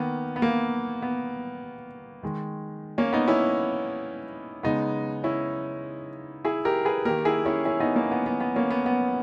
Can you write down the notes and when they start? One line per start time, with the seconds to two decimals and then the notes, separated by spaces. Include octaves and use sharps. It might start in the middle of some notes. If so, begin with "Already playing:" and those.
Already playing: D#3 A#3 B3
0.36 B3
0.42 A#3
1.02 B3
2.23 D#3 G#3
2.98 A#3 C#4
3.13 B3 D#4
3.28 C#4 E4
4.63 C#3 G#3 B3 D#4
5.24 C#4 E4
6.45 E4 G#4
6.65 G4 A#4
6.85 G#4 B4
7.05 D#3 A#3 G4 A#4
7.25 E4 G#4
7.46 C#4 E4
7.65 C#4 E4
7.80 B3 D#4
7.96 A#3 C#4
8.11 B3
8.26 B3
8.40 B3
8.56 A#3 C#4
8.71 B3
8.86 B3